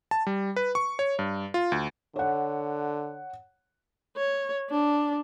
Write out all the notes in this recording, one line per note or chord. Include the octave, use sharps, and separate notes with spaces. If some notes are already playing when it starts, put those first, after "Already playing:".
A5
G3
B4
C#6
C#5
G2
F4
D2
D3 C#5 F#5
C#5
D4